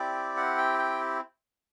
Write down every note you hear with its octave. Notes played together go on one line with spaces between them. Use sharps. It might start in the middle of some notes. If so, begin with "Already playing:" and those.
Already playing: C4 E4 G4 D5
F#5
G5
G5